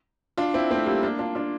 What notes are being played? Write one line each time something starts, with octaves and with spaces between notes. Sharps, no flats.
D4 F4
C4 E4
A3 C4
G3 A#3
A#3 D4
D4 F4
D4 F4